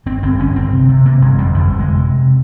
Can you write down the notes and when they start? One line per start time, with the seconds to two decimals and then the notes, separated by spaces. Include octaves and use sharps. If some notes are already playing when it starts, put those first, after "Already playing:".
0.06 G1 C4
0.23 G1 C4
0.39 G1 C#4
0.56 G1 C4
0.72 C3
0.89 C3
1.05 C3 A#3
1.21 G1 G#3
1.38 F2 G3
1.55 G1 F3
1.72 F2
1.79 G#3
1.88 C3
2.04 C3